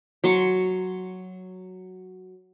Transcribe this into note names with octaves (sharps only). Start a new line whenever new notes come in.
F#3 C6 C#6